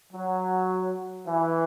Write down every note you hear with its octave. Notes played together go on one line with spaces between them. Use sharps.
F#3
E3